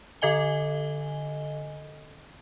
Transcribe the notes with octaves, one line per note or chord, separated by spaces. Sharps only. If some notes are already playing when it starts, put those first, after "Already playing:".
D3 A4 D#5 G#5 G7